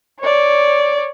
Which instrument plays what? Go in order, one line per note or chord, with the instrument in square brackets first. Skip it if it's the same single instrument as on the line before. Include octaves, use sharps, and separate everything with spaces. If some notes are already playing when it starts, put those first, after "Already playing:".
[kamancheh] C#5 D5